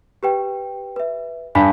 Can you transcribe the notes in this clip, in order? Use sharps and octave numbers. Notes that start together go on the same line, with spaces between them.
G4 B4 G5
B4 E5
G2 G#5 B5 B6